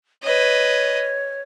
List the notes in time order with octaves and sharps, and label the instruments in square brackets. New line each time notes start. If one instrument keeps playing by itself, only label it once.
[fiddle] B4 D#5 [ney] C#5